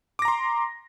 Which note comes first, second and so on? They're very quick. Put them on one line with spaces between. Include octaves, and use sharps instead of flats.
D6 A#6 A#5 C6